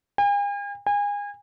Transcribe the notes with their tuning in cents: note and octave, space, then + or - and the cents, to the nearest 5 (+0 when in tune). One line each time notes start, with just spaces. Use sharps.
G#5 -45
G#5 -30